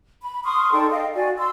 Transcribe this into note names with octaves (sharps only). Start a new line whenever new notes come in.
B5
C6 C#6 D#6 F6
D#4 A4 D5 G5
D#5 F5 G5
F#4 D5 G#5
C6 E6